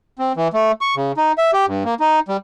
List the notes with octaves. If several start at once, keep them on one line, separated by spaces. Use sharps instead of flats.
C4
E3
A3
C#6
C#3
D#4
E5
G4
G2
A#3
D#4
G3